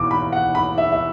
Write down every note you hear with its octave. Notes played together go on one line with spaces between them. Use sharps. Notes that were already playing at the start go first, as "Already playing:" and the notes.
Already playing: E2 B2 D6
B5
F#5
B5
E5
E5